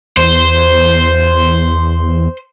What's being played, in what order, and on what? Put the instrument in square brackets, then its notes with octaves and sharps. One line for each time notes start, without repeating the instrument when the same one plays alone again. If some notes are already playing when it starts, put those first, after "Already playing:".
[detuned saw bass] E2 [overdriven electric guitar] C5